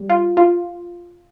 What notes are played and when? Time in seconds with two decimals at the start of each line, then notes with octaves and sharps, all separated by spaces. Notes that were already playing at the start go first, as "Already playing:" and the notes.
Already playing: G3
0.09 F4
0.37 F4